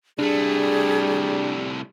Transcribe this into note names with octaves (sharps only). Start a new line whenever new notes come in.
C2 G3 A3 D4 G#4